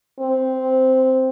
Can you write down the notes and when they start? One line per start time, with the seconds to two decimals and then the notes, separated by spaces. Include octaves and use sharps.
0.20 C4